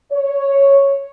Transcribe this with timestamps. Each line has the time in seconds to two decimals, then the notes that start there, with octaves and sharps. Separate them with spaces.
0.11 C#5